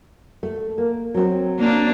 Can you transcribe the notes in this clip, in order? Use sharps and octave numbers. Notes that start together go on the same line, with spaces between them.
A3
A#3
F#3 C4
A#3 D4